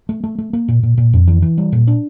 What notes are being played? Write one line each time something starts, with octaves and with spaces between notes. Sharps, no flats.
A3
A3
A3
A#3
A#2
A#2
A#2
F2
E3
E3
G3
A#2
D4